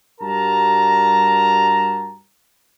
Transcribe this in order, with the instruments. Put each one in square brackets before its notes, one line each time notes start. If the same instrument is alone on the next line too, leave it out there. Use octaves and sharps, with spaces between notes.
[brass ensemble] G2 G3 F#4 A#4 A5 A#5